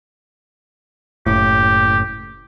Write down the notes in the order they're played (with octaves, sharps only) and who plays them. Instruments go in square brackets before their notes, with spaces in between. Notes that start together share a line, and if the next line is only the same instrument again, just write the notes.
[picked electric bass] F#1 A2 [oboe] G4